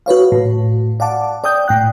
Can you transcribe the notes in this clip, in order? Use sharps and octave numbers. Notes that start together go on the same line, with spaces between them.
F#4 B4 C#5 F5
A2
D5 F5 F#5 A5 D6
D5 G5 D#6 G6
A2 G5 F#6